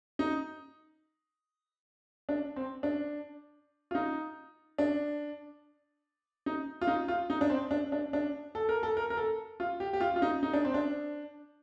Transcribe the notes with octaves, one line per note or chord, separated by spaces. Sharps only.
D#4
D4
C4
D4
F4
D#4
D4
D#4
F4
D#4
F4
D#4
D4
C4
D4
D4
D4
A4
A#4
A4
A#4
A#4
A4
F4
G4
G4
F4
F4
D#4
D#4
D4
C4
D4